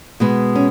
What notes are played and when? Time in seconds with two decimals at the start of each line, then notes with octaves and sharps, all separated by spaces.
0.20 B2 G#3 B3
0.55 C#4